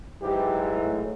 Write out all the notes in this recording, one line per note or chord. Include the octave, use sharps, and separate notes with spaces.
G#2 E3 F#3 G4
A2